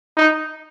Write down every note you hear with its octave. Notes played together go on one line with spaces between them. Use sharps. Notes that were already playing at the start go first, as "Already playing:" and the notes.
D#4